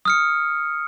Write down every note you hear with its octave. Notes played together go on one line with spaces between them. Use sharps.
D#6 F6 C#7